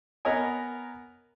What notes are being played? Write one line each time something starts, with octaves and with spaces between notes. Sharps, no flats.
B3 A#4 C#5 D#5 G#5